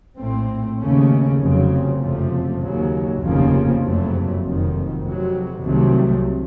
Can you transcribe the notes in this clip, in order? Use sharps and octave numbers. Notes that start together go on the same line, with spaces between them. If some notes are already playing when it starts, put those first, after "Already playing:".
A#1 A2 A3 C4
D#2 C#3 A3 C#4
F1 F2 C#3 F#3 C4
F#1 F2 C3 F3 A3
D#2 C#3 F#3
F1 D#2 C#3 F3 A#3
F#1 F2 C3 F#3 A3
F1 F2 D#3 F#3
F2 C3 F#3
C2 C3 D#3 F#3 A3